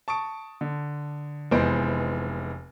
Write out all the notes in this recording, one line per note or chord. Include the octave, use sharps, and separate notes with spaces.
A5 C#6 D#6 D7
D3
F1 E3 G#3 B3 C5 D7